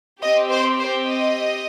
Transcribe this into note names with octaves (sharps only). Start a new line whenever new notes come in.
C4 G4 D#5
C5
C5
D#5